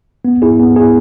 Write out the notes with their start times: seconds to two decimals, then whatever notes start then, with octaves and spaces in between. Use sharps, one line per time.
0.25 B3
0.42 E4 G#4
0.59 B3
0.76 E4 G#4